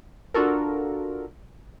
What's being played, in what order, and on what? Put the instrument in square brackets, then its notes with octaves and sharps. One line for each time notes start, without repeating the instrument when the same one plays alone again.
[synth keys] D4 F4 F#4 A4 A#4